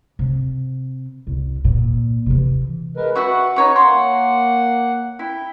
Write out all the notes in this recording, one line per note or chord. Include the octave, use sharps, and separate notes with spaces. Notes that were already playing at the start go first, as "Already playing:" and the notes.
C3
C2
A#2
C3 E3
G#3 A#4 B4
F#4 B4 E5 F#5 C#6
D#4 C#5 C#6
A#3 C#5 F#5 C6 C#6
E4 G5